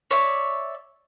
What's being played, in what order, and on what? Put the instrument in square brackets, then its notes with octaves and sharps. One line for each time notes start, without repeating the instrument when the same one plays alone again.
[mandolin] C#5 D5 E5